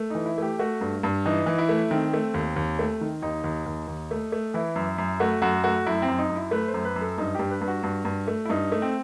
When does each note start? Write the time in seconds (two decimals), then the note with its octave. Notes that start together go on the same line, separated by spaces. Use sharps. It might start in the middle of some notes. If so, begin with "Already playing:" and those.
Already playing: A3
0.10 E3 D#4
0.26 E4
0.38 A3 G4
0.59 A3 F#4
0.81 G2
1.03 G2
1.26 E3 D#4
1.46 E3
1.58 E4
1.69 A3
1.91 D#3 C4
2.13 A3
2.34 D#2
2.56 D#2
2.79 A3
3.01 D#3
3.22 D#2 D#4
3.44 D#2
3.66 D#2
3.88 D#2
4.11 A3
4.32 A3
4.54 E3 E4
4.76 F#2
4.98 F#2
5.20 A3 F#4
5.42 F#2 F#4
5.64 A3 F#4
5.86 F#2 E4
6.02 C4
6.08 F#2
6.18 D#4
6.29 F#2
6.35 E4
6.51 A3 B4
6.68 C5
6.74 F#2
6.85 B4
6.96 F#2
7.01 A4
7.18 G2 D#4
7.35 G2 G4
7.51 B4
7.61 G2
7.68 F#4
7.83 G2
8.05 G2
8.28 A3
8.45 E4
8.50 G2 D#4
8.72 A3
8.82 C4